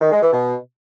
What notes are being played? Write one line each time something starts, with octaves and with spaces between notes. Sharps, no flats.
D#3
G#3
E3
B2